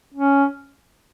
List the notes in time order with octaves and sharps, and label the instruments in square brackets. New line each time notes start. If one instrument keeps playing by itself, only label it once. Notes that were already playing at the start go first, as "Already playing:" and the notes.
[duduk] C#4